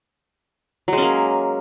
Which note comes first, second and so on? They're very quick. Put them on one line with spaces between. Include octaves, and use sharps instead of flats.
F#3 G#3 C#4 A#3